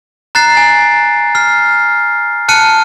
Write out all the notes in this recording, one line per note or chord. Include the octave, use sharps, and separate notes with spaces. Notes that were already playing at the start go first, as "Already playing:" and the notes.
A#5 F#6 A6 C7
G#5
F6 C7
A5 F6 F#6 C#7 D#7